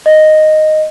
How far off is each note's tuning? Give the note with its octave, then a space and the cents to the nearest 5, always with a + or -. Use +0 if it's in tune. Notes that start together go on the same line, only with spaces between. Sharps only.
D#5 -5